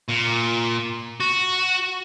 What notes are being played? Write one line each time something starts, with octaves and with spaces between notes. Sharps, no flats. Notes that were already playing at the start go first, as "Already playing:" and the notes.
A#2
F#4